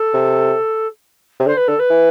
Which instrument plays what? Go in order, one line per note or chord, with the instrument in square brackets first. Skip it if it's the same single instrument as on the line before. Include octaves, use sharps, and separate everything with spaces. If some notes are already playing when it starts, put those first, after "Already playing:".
Already playing: [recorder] A4
[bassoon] C3
C3
[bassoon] D3 [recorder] C5
[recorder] B4
[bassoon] D3 [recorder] A4
[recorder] B4
[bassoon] E3